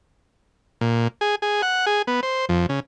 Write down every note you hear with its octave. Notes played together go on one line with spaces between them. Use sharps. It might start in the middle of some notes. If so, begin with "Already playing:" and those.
A#2
G#4
G#4
F#5
G#4
B3
C5
F2
C#3